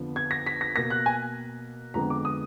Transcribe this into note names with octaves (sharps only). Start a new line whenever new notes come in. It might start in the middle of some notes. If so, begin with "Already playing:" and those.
Already playing: F2 D3 F3 B3
G#6
A#6
B6
A#6
B2 A#3 A#6
F#6
G#5
F2 D3 G#3 B3 A#5
D6
D#6